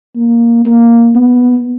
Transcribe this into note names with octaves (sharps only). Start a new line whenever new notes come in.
A#3
A#3
B3